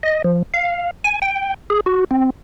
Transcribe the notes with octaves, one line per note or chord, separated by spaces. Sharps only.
D#5
F3
F5
G#5
G5
G#4
F#4
C4